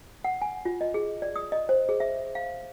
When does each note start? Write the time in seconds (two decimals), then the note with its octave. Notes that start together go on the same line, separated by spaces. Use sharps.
0.24 F#5
0.42 G#5
0.65 F4
0.81 D#5
0.94 G#4
1.22 D5
1.36 D#6
1.52 D#5
1.69 C5
1.89 G#4
2.00 E5
2.35 F5